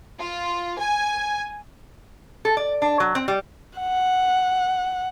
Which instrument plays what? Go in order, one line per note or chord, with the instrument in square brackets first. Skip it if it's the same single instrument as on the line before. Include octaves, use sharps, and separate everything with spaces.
[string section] F4
G#5
[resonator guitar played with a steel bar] A4
D5
D4
F#3
C4
G3
[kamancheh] F#5